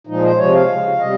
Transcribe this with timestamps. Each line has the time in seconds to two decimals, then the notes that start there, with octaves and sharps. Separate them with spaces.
0.07 A#2 F3 G#3 D#4
0.23 C5
0.38 C3 F3 G#3 C#5
0.54 F5
0.69 C#3 G#3
0.99 C3 G3 D#5